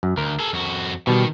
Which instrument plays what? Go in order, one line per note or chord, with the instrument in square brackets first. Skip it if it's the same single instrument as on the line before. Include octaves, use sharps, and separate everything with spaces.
[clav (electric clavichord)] F#2
[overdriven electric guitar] D2 [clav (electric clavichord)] A#4
[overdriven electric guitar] G#4 A4
F2 F#4
[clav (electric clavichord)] B2 G3 [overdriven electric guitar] D#3